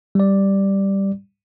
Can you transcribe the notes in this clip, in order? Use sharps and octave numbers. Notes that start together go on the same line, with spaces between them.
G3 D5